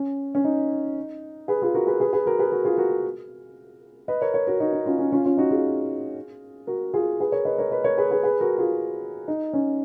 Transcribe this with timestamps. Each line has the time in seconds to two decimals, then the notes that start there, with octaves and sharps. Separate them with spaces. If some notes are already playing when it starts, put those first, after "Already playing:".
Already playing: C#4
0.35 C#4
0.44 D#4
1.48 G#4 B4
1.62 F4 G#4
1.74 F#4 A#4
1.87 G#4 B4
2.00 G#4 B4
2.13 G#4 B4
2.26 F#4 A#4
2.39 G#4 B4
2.52 F#4 A#4
2.65 F4 G#4
2.78 F#4 A#4
4.08 B4 D#5
4.22 A#4 C#5
4.34 A#4 C#5
4.47 F#4 A#4
4.60 D#4 F#4
4.73 D#4
4.86 C#4 F4
4.99 C#4
5.12 C#4 F4
5.25 C#4 F4
5.37 D#4 F#4
5.50 F4 G#4
6.67 F#4 A#4
6.94 F4 G#4
7.20 G#4 B4
7.32 A#4 C#5
7.45 B4 D#5
7.58 A#4 C#5
7.71 B4 D#5
7.84 A#4 C#5
7.98 G#4 B4
8.11 G#4 B4
8.23 G#4 B4
8.40 F#4 A#4
8.58 F4 G#4
9.28 D#4
9.53 C#4